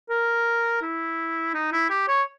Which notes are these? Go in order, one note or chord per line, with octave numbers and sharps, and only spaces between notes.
A#4
E4
D#4
E4
G4
C#5